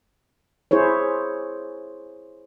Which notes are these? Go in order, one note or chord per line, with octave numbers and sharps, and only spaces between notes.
E4 G#4 C5 C#5